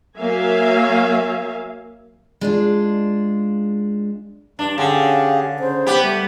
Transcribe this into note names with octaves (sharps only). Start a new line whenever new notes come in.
F#3 A#3 E5 F5 G#5
G#3 D4 F4
G2 D4
D3 C#4 G4 G#4 F5
C#3 C5
B3 G4 B5
G3 A3